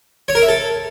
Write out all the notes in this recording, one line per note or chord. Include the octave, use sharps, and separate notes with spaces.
C#5
A#4
E5
A4